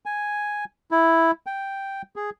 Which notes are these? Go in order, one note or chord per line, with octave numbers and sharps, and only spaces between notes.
G#5
E4
G5
G#4